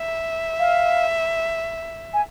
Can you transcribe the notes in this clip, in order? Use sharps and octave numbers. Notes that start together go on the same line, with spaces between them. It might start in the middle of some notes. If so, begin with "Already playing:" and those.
Already playing: E5
F5
G#5